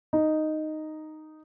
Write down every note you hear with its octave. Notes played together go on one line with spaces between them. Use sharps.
D#4